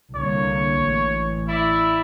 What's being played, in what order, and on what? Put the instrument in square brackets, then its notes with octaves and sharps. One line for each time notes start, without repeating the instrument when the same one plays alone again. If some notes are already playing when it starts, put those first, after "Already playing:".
[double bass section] C2 D3 A#3 [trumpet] C#5
[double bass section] A1
[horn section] E4 D5 E5